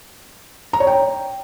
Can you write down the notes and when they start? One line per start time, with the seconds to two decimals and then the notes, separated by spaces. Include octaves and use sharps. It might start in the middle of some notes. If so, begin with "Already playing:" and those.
0.73 A#5
0.80 C#5
0.87 G5